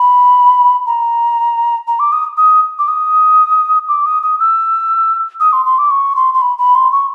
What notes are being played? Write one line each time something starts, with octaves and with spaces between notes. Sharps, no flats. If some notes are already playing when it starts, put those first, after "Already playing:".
Already playing: B5
A#5
A#5
D6
D#6
D#6
D6
D#6
D6
D#6
D#6
E6
D#6
C6
C6
D6
C#6
C6
C6
B5
B5
C6
C#6